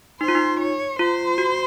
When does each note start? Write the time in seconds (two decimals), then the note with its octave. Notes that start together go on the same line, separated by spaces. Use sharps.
0.21 D#4 C5
0.28 F4
0.35 D#4
0.60 C#5
0.99 F4 C5
1.38 F#4